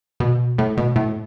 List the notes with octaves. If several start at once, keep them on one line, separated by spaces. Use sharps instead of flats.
B2
A2
B2
A2